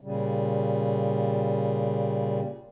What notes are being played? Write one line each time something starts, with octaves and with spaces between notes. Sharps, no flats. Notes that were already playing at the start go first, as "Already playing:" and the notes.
A#2 C#3 G3